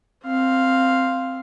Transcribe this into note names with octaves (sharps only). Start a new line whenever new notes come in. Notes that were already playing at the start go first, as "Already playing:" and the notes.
C4 F5